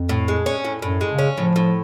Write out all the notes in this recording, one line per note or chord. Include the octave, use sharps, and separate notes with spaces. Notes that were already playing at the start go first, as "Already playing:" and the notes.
Already playing: F2
A2
G#3
C#4
A2
F#2 A2
G#3
C#3
C#4
A2 F3
A2